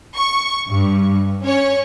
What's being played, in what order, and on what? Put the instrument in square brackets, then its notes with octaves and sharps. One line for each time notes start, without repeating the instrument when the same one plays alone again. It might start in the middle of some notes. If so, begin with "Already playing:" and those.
[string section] C#6
G2
C#4 C#5